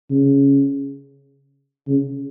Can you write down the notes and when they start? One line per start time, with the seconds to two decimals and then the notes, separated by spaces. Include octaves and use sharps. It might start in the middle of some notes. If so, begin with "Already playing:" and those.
0.11 C#3
1.88 C#3